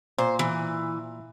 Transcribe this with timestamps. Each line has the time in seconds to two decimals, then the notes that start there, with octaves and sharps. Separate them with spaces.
0.18 A#2 C5
0.39 E3